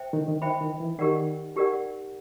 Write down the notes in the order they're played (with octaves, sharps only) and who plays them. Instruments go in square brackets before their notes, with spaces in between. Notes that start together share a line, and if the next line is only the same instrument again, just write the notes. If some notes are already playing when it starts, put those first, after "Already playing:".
Already playing: [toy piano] C5 E5 G5
[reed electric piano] D#3
D3
D#3
[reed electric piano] D#3 [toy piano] C5 E5 G5 B5
[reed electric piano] D#3
E3
[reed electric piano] D#3 [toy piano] D#4 G4 A#4 D5 F#5
[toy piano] D#4 G4 A#4 D5 F#5